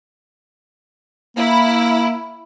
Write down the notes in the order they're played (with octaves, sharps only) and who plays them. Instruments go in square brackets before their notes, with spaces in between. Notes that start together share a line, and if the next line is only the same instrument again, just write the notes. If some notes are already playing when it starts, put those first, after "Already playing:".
[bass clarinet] A#3 [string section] E4